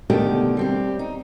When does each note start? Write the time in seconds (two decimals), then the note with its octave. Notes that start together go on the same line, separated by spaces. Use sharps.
0.10 B2 D3 D#3 A3 G4
0.57 G3 C4 G4
0.99 D#4